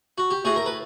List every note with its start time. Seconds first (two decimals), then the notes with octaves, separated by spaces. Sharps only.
0.18 F#4
0.31 G4
0.45 A2 F#4 G#4
0.56 A#4
0.66 B4